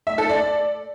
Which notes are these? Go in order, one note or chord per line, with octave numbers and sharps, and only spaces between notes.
E5
A4
D5